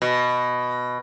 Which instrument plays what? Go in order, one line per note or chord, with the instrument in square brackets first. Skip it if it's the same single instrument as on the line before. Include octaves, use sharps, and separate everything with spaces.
[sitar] B2